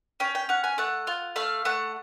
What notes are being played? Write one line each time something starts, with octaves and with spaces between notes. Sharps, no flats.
C#4 G5
G5
C#4 F#5
G#5
A3 F#5
F4
A3 F5
A3 F#5